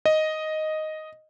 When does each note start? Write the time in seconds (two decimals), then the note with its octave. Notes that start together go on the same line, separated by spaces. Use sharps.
0.06 D#5